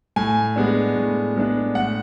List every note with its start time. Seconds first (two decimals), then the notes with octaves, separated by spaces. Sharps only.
0.16 A2 G#5
0.56 G#3 B3 D4
0.95 A2
1.36 G#3 B3 D4
1.75 A2 F#5